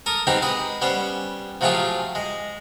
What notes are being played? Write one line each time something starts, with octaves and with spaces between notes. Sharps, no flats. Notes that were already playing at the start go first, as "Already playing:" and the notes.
A4 A#4 D#6
B3 C4 D#4 G4 G#4
G#3 B4 D#5
G3 B3 C#4 C5
F3 F#3 A3 F4 G4 G#4
G#3